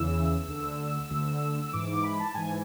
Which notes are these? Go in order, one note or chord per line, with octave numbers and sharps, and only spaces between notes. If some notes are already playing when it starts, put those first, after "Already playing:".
Already playing: E2 C#3 E3 E6
D2 D3
D2 D3
G#2 E3 D6
D6
B5
A5
G#2 E3 G#5